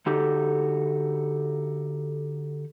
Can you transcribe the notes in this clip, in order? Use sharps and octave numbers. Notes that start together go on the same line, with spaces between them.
D3 D#4 F#4 G4 A4